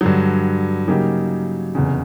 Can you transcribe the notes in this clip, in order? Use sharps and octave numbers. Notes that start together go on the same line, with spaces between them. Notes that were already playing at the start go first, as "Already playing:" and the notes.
G2 D3 F#3
C#3 F#3 A#3 D#4 G4
F1 E2 C#3